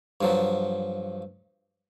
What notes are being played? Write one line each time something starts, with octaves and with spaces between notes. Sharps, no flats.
G2 F3 F#3